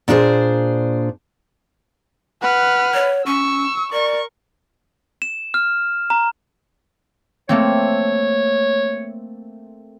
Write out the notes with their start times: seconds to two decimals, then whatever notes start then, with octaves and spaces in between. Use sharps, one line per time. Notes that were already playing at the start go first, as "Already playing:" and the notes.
0.08 A#2 D4 G#4 A4 C5
2.42 B4 F#5 F6
2.94 C#5
3.26 C#4 C#6 E6
3.93 A#4 D5 C#6
5.22 E7
5.54 F6
6.10 A#5
7.49 A3 A#3 C4 C#5